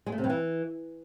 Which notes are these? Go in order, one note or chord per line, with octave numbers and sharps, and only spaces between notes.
G#3
A3
C3
G2
E3